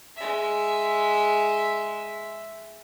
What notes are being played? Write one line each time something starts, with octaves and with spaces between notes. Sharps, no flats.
G#3 E5